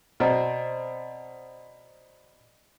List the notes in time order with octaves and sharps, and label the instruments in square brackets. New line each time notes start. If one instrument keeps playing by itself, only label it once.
[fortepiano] B2 C4 [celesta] D5 D#5 A#5